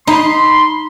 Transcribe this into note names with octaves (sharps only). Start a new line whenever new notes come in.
D#4 B5 C6